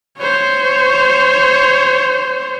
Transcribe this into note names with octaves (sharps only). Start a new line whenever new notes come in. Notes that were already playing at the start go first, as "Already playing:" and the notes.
C5 C#5